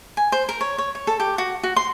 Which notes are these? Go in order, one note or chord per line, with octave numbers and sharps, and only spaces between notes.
G#5
C5
A#4
C#5
C#5
C#5
A4
G4
F#4
F#4
C6